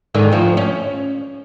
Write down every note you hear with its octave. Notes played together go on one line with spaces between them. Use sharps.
G#2 D3 D#3
D2 F3
C#4